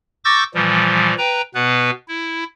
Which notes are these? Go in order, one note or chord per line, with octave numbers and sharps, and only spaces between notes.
C#6 D6 E6 G6 A6 A#6
A#2 E3 F3 G3
B4 G5 A#5
B2 B3 B4
E4